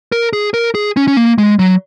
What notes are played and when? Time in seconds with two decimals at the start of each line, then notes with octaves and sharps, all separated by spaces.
0.12 A#4
0.33 G#4
0.54 A#4
0.75 G#4
0.97 C#4
1.08 C#4
1.17 A#3
1.38 G#3
1.59 F#3